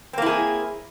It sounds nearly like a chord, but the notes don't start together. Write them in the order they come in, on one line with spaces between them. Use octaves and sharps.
C4 A#3 E4 G#4